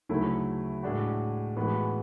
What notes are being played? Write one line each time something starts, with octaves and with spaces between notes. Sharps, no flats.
D2 C#3 F#3 A3 E4
A2 G#3 D4 F#4
A2 E3 G#3 B3 F#4